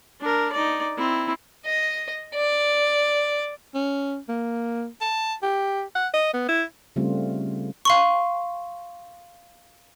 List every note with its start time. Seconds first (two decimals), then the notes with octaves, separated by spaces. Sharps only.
0.21 D4 A#4
0.52 D#4 D5
0.97 C4 E4
1.66 D#5
2.35 D5
3.75 C#4
4.29 A#3
5.01 A5
5.43 G4
5.95 F#5
6.14 D#5
6.34 B3
6.49 E4
6.96 C#3 G3 A3 C4 F4
7.85 F5 C6 C#6